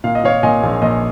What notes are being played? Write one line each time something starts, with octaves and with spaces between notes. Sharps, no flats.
A#2 F5
D#5
A#2 C#5 F5
A#2 D#5 G#5
A#1
A#1 D#5